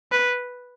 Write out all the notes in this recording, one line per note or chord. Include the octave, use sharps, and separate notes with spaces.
B4